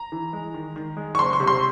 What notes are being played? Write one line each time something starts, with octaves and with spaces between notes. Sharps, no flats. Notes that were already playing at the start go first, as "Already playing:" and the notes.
Already playing: A#5
E3
G#3
D#3
D#3
G#3
C#6
F#1 C6
C#6
C3
C6